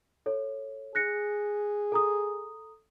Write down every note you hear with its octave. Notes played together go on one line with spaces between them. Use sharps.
A4 C#5
G#4 F#6 A#6 C#7
A4 A#5 D#6